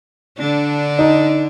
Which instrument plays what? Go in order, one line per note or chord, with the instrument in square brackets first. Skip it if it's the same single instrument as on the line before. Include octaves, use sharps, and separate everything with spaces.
[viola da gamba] D3 D4
[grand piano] D#4